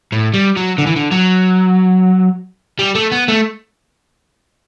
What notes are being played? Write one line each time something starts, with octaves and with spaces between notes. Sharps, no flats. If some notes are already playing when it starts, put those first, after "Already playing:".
A2
G3
F#3
D3
E3
D3
F#3
G3
A3
B3
A3